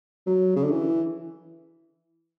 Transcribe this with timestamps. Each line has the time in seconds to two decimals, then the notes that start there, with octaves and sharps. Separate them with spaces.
0.27 F#3
0.56 C#3
0.64 D3
0.71 E3